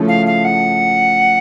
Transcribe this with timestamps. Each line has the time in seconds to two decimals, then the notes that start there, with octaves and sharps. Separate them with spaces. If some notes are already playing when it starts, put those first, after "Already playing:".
Already playing: C#3 F3 A3 C#4 E4
0.08 F5
0.26 F5
0.44 F#5